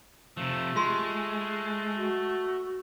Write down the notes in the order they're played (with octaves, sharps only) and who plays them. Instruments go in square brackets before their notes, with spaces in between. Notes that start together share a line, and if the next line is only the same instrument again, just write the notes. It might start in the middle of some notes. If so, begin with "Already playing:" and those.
[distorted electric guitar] C3 F3 [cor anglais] A3
[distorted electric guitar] G#3 [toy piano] F4 G4 C6
[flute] F#4